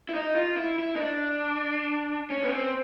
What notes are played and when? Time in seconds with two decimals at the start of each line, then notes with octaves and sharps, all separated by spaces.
0.09 E4
0.14 D#4
0.36 F4
0.57 E4
0.79 E4
0.96 D#4
1.01 D4
2.30 C#4
2.44 B3
2.52 C4